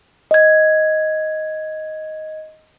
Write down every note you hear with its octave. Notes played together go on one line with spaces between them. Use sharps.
D#5 G#6